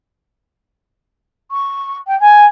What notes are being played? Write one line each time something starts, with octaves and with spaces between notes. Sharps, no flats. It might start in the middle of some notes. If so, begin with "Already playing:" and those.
C#6
G5
G#5